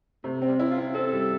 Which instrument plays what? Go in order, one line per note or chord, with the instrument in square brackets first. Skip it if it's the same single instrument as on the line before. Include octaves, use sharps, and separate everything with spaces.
[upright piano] C3 [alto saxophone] A3
[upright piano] C4
[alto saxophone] G3
[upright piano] E4
[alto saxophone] F4
[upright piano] C4
[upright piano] C4 [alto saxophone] A4
[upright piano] G3